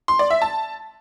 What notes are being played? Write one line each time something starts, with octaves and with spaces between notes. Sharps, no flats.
C6
D5
E5
A5